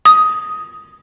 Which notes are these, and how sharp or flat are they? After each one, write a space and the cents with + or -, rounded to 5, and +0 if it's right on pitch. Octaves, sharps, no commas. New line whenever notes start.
D#6 +10